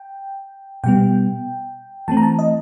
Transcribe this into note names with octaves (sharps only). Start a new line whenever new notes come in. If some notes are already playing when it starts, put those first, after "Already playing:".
Already playing: G5
B2 G3 B3 G5
E3 A3 C4 A5
A#5
A5
D#5